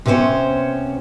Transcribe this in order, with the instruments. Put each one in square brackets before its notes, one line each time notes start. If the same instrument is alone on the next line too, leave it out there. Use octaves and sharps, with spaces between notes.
[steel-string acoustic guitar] C3 B3 C#4 C5 C#5